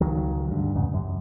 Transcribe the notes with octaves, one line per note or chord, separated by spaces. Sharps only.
C#2 D#3 F#3
D2 G2
E2 G#2 C#3
F#2